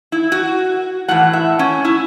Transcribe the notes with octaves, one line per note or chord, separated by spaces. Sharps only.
E4
F#4
A2 E3 F#5
E5
C#4
E4